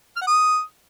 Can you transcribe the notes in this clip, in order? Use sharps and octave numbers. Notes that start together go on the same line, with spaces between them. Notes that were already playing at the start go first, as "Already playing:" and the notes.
F6
F#5
D#6